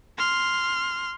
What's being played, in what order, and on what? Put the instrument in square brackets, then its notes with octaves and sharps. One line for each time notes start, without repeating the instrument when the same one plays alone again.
[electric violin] C6 F6